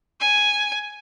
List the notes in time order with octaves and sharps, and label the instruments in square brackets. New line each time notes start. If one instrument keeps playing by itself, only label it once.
[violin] G#5